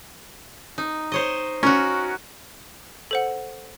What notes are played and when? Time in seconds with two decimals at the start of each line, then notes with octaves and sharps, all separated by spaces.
0.78 D#4
1.12 C5 C#5 D#5
1.63 C#4 F#4 A#4
3.11 A4 C5 F#5